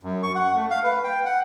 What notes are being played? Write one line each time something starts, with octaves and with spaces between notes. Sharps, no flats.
F#2
C#6
F#5
A3
F5
B4
G5
F#5